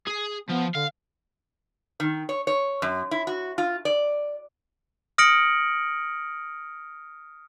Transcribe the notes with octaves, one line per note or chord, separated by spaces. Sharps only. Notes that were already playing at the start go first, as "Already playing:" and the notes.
G#4
F3 B3
D3 F5
D#3
C#5
C#5
F#2
E4
F#4
F4
D5
D#6 F6 A#6 C#7 D7 F#7